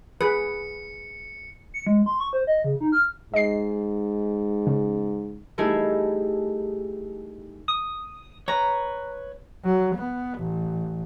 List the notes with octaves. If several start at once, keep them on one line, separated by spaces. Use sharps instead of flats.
G#4 B4 C#7
C#7
G#3
C6
C#6
C5
D#5
C#3
D#4
F6
G#2 D#5 C7
C#3
G3 A3 D#4 E4 G#4
D#6
B4 C#5 A#5
F#3
B3
A1